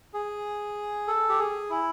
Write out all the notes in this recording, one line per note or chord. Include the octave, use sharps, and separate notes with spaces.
G#4
A4
G4
G#4
E4